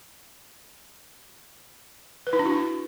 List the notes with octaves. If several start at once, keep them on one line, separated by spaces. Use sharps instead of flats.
B4
E4
D4
F#4
E4